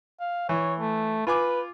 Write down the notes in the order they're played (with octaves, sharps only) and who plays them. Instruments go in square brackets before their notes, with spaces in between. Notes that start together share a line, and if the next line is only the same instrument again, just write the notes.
[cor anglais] F5
[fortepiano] E3 [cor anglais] C#5
[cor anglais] A3
[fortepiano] F4 G#5 D6 [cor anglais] B4